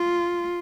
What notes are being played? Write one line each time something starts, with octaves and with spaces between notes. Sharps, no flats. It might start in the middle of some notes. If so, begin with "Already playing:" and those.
Already playing: F4